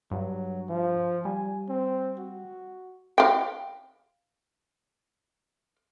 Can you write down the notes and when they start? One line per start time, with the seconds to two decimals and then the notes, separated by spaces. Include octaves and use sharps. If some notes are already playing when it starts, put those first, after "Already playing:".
0.11 G2 F#3
0.69 F3
1.25 G3 G#5
1.68 C4
2.19 F#4
3.18 F5 G5